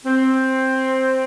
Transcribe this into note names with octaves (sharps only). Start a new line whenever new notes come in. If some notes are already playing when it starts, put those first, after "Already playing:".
C4